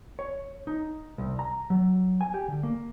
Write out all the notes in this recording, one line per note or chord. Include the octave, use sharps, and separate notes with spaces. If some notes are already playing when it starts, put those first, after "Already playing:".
C#5
D#4
C2
A#5
F#3
G#5
G4
D3
A#3